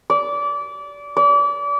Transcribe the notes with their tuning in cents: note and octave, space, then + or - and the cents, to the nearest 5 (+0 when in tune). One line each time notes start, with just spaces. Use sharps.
D5 -25
D5 -35